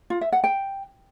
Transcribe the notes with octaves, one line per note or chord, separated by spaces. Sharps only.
F4
E5
F#5
G5